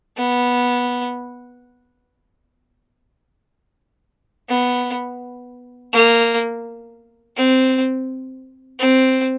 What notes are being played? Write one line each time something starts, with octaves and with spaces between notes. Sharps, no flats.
B3
B3
A#3
C4
C4